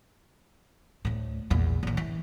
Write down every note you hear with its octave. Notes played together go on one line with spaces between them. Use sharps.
D2 A2
A#1 E2
A1 D#2
E3